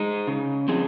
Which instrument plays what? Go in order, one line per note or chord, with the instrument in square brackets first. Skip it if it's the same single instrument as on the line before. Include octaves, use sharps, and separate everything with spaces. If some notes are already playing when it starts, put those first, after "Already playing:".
Already playing: [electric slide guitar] G#3 D#4
C#3
F3 C4 D#4 G#4